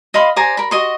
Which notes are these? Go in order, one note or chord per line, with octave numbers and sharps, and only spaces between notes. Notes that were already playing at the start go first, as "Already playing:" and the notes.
D#5 F5 B5 C6
C5 D5 G#5 A#5
A#4 B5
F#4 D#5 C6